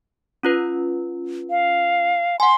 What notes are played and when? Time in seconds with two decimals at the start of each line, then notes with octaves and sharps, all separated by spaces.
0.43 C#4 F4 B4
1.50 F5
2.40 F#5 G#5 C6